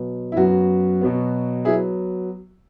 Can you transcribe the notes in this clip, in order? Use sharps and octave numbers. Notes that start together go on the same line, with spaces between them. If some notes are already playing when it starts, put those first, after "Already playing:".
Already playing: B2 F#3 B3
E4
F#2 F#3 B3 F#4
B2 F#3 B3
F#3 B3 E4 G#4